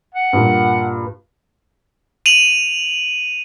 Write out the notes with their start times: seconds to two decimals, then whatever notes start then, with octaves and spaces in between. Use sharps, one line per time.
0.15 F#5
0.33 G2 A#2
2.26 D#7 F7 F#7